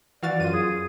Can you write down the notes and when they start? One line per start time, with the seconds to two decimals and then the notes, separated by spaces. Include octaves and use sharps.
0.23 E3 F#4 D5 F5 A6
0.40 F#2 F4 D#7
0.53 G#4